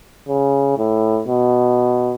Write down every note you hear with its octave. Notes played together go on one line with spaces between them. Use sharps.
C#3
A2
B2